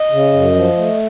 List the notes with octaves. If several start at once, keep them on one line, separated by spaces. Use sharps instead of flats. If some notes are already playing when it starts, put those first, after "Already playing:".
Already playing: D#5
C#3
F#2
F3
A3